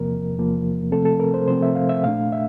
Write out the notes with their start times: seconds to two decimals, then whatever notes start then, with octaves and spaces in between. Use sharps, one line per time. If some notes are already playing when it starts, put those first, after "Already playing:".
Already playing: E2 C3 F3 A#3 A#4
0.36 E2 C3 F3 A#3
0.91 C3 F3 A3 C4 A4
1.05 A4
1.20 A#4
1.34 C5
1.47 C3 F3 A3 C4 C5
1.62 E5
1.75 F5
1.89 E5
2.04 A#2 A3 D4 F5
2.32 E5